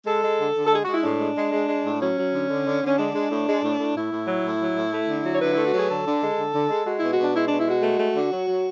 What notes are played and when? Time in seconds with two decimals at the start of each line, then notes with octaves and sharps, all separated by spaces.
0.06 G#3 A4
0.23 G#3
0.39 D3
0.55 D3
0.65 A4
0.71 G#3 G#4
0.84 G#3 F#4
0.94 E4
1.03 A2 D4
1.19 G#3
1.36 G#3
1.52 G#3
1.68 G#3
1.84 A2
2.00 F#3 C#4
2.17 F#3
2.33 D3
2.49 D3
2.65 D3
2.81 D3 C#4
2.98 G#3 D4
3.13 G#3
3.30 A2
3.46 G#3
3.62 A2
3.78 A2
3.95 A2 E4
4.11 A2
4.27 F#3
4.43 A2
4.59 F#3
4.75 A2
4.92 A3
5.08 D3
5.24 F#3
5.33 C#5
5.40 D3 B4
5.53 A3 E4
5.64 F#4
5.72 F#3 G#4
5.89 D3 A4
6.05 D3
6.21 G#3
6.37 D3
6.53 D3
6.70 G#3
6.85 G#3 F#4
6.98 B2 E4
7.11 F#4
7.18 B2 D4
7.34 G#3 E4
7.46 B2 D4
7.58 E4
7.67 G#3 F#4
7.83 A3
7.99 A3
8.15 D3
8.31 F#3
8.47 F#3